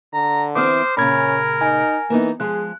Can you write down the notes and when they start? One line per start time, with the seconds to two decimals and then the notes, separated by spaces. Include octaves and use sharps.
0.14 D3 A#5
0.55 E3 C4 C5 D6 D#6 F6
0.97 A#2 C#3 C#4 A#4 B5 G#6
1.61 D#4 G#5
2.10 E3 A#3 B3 D#4
2.40 F3 G#3 G#4 F#6